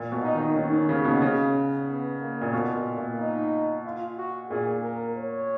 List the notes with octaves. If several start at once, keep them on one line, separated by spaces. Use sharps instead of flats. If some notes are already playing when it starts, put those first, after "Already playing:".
Already playing: A#2
B2
D#4
D#3
D#3 C#4
D#3
C#3
B2
C#3
B3
A#3
A#2
B2 F4
A#2
A#2
D#4
F4
F#4
A#2 G#4
A#4
C#5